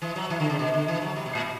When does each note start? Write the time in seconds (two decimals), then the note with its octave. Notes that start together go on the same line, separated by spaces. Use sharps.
0.02 E3
0.16 F#3
0.30 E3
0.40 D3
0.50 C#3
0.59 B2
0.74 D3
0.88 E3
1.01 F#3
1.16 G3
1.26 B2
1.35 A2